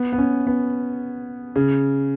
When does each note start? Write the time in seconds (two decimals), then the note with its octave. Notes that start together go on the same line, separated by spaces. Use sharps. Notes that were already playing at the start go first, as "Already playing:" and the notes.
Already playing: B3
0.13 B3
0.18 C#4
0.47 B3
1.56 C#3